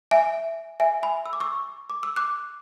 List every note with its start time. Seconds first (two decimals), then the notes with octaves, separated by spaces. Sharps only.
0.11 E5 G#5
0.80 E5 G#5
1.03 G#5 B5
1.26 E6
1.33 D6
1.40 C#6 E6
1.90 D6
2.03 E6
2.16 D6 F#6